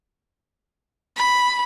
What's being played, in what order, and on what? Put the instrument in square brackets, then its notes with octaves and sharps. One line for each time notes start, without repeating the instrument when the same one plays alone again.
[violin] B5